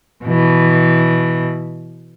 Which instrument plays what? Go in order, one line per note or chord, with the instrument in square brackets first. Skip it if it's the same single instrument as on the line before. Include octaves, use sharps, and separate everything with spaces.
[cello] B2 E3